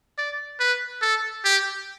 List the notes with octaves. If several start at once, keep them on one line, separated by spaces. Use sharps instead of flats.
D5
B4
A4
G4